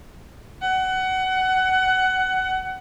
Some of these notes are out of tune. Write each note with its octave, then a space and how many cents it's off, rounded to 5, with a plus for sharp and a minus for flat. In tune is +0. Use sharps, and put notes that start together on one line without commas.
F#5 +20